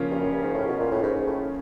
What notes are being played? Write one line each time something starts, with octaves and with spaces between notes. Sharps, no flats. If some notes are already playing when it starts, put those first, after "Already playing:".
Already playing: C#3 F3 A#3 C#4 F4
G2
F#2
G2
G#2
A2
B2
A#2
A2
G#2
G#2
A2